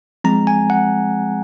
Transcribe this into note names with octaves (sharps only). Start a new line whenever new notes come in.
F3 G#3 C4 A#5
G#5
F#5